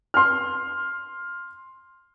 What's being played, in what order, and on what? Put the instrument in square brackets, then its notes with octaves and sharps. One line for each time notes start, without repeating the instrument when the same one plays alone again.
[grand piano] C6 F6